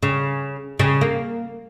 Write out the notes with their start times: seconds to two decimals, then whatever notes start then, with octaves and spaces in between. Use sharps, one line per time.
0.03 C#3
0.79 C#3
1.01 A#3